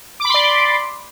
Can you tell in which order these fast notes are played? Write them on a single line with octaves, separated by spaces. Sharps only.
D6 B5 C6 D5